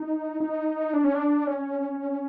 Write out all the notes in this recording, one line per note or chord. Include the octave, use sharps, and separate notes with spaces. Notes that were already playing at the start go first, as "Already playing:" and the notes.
Already playing: D#4
D#4
D4
C#4
D4
C#4